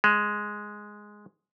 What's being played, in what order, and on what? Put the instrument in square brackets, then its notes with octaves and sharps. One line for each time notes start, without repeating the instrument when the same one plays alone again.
[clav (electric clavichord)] G#3